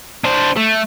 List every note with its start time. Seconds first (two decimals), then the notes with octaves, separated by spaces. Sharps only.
0.24 D4 C5
0.56 A3